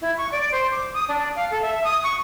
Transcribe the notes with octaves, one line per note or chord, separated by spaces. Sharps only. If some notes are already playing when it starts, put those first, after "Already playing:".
E4
C#6
D5
C5
D6
D#6
D4
F5
A4
E5
D#6
C#6